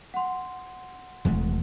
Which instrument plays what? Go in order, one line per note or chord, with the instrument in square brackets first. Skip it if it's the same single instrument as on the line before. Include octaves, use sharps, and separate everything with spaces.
[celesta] F#5 C6
[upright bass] F1 [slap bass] E2 G#3 A3